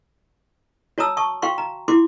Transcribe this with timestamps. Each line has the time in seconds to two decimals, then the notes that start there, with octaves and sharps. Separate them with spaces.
0.98 F#4 C#5 A5 A#5 D#6 E6
1.17 A5 C#6 D#6
1.42 F#4 F5 G5 C6 C#6
1.58 A#5
1.88 E4 F4 G4 C6 D6